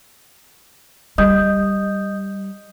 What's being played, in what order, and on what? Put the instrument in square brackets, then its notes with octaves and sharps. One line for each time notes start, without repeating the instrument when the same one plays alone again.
[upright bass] G3 [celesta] D#5 D#6 G6